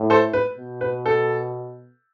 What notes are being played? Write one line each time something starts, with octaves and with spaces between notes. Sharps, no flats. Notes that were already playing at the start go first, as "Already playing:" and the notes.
Already playing: A2
A4 C5
B4
B2
B4
A4